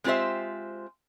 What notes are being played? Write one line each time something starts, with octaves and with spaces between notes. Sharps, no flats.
G#3 C4 F4 G4 C5 E5